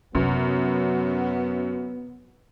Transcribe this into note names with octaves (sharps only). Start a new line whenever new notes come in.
F#2 C3 F#3 B3